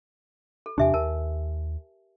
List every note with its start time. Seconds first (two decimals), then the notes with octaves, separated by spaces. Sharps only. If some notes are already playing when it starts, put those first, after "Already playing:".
0.66 A4
0.78 E2 C3 D4 G4 E5 G#5
0.94 D#2 A#4 A5